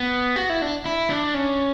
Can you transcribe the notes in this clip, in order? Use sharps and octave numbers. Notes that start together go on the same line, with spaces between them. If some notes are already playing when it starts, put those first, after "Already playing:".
Already playing: B3
F#4
E4
D4
E4
D4
C#4